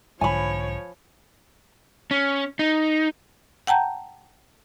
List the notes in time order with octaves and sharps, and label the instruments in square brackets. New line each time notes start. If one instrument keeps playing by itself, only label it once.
[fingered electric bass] B1 G#2 D3 [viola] F3 C#5 [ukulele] G#5 B5
[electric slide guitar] C#4
D#4
[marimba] F#5 G5 A5 A#5 G6